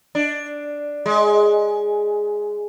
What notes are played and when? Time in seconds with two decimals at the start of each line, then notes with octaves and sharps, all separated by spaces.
0.15 D4
1.06 G#3